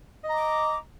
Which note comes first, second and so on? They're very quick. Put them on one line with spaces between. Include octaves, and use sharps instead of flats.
D#5 A#5 D6